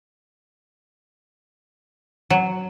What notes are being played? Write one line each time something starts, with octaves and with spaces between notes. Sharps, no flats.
F#3